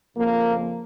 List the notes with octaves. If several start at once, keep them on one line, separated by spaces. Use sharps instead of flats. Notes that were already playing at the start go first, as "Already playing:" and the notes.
F2 C#3 F3 A#3